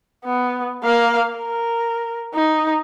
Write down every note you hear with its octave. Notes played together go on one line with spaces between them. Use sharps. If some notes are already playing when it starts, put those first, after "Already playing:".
B3
A#3 F5
A#4
D#4